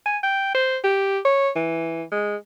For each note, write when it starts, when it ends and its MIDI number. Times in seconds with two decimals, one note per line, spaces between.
0.06 0.18 80
0.23 0.51 79
0.55 0.77 72
0.84 1.19 67
1.25 1.50 73
1.55 2.03 52
2.11 2.36 56